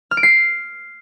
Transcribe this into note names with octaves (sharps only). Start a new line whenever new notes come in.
F6
D7
C7